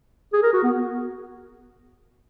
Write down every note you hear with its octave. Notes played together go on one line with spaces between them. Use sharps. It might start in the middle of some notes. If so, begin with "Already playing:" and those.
G#4
A#4
F#4
B3